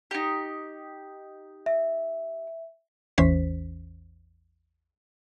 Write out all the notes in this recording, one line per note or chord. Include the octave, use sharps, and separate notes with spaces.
D#4 G4
E5
A1 E2 E3 C#4 C5 B6